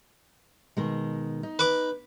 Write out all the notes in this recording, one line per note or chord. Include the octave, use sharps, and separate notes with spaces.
B2 D#3 G#3
D#4
B4 D6